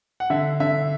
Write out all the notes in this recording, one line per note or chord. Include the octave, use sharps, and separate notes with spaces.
F#5
D3 E5
D3 E5